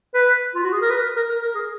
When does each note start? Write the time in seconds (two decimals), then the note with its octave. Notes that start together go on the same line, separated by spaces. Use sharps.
0.15 B4
0.55 F4
0.64 F#4
0.72 G#4
0.82 A#4
0.91 B4
1.16 A#4
1.29 A#4
1.42 A#4
1.55 G#4